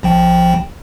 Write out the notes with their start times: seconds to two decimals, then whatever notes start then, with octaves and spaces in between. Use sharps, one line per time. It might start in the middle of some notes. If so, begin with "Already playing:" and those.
0.03 A#1 F3 G5